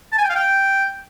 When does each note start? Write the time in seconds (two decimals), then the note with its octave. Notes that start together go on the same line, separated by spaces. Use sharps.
0.13 A5
0.18 G#5
0.24 G5
0.30 F5
0.36 G5